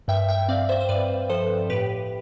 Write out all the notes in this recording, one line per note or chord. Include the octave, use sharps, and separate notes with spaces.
G2 E5 G5
E5 G5
C4 D5 F5
C5 E5
C5
G2 B4 D5
F3 A4 C5
A2 G4 B4